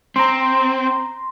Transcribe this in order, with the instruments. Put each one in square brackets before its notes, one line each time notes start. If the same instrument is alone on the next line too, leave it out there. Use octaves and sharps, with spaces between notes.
[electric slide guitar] C4 [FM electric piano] A#5 C6